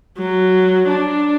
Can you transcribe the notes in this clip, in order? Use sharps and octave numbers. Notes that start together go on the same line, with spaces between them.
F#3
D4